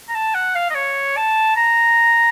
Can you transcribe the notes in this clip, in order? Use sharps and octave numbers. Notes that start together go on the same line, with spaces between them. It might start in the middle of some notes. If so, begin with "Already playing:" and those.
A#5
A5
F#5
F5
D#5
C#5
A5
A#5